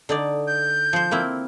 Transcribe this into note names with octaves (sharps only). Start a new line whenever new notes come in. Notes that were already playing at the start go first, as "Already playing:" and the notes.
D3 D#4 D5
G6
F3 C5
A#3 C4 E4